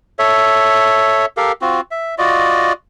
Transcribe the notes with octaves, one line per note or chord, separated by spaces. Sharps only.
A4 C#5 E5
G4 A4 A#4 F5
C4 F4 F#4
E5
F4 F#4 D5 D#5